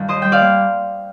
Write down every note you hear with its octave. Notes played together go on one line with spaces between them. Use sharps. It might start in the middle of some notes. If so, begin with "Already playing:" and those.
Already playing: G2 D#3 F5
D#2 C5 D#5
G3 G5
D5 F5
A#3